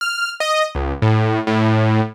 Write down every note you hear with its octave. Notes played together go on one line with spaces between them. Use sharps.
F6
D#5
C#2
A2
A2